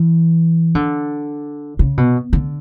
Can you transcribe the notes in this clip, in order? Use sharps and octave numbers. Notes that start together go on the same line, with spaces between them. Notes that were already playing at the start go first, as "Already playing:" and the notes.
Already playing: E3
D3
C#3
B2
D3